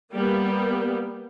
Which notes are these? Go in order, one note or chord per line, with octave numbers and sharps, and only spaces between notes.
G3 A#3 B3